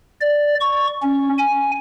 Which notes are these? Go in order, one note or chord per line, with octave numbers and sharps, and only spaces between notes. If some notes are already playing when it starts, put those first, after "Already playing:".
D5
C#6
C#4
G#5